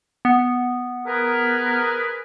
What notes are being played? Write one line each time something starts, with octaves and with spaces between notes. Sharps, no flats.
B3
G#4 A#4 B4